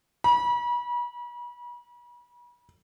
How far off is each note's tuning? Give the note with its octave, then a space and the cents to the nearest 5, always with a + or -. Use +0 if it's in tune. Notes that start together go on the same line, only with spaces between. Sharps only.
B5 -40